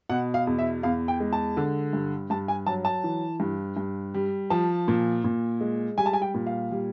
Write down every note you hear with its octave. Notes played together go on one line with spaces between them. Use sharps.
B2 F#5
F5
E2
E5
E2 F5
G5
G#3
A5
D3
G2
G2 A5
G#5
F#3 A5
A5
E3
G2
G2
G3
F3 A5
A#2
A#2
G#3
G3 G#5
A5
G#5
G5
A#2
F5
G3